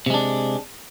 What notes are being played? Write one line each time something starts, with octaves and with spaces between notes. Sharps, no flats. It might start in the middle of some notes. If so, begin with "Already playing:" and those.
C3 G#3 D4